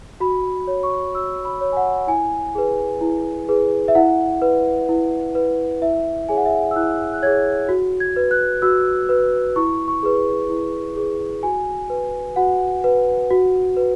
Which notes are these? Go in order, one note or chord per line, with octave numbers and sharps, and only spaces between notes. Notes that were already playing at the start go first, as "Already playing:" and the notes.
F#4 B5
C#5
C#6
F#4 E6
B5
C#5
G#5
F#5
E4 G#5
G#4 B4
E4
G#4 B4
E5
E4 F#5
B4
E4
B4
E4 E5
G#4 C#5 G#5
F#5
E5
F#5
E6
E4 F#6
F#6
G#4 C#5 G#6
F#4
G#6
B4
F#6
F#4 E6
B4
E4 C#6
C#6
G#4 B4
E4
G#4 B4
F#4 G#5
B4
F#4 F#5
B4
F#4
B4